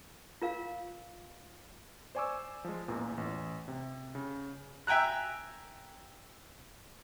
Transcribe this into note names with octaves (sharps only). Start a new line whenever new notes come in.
F4 A#4 F5
C5 D5 G#5 C#6 D6 E6
F3 G#3
A1 E2 A#2
A1
C3
C#3
E5 G5 G#5 A#5 F#6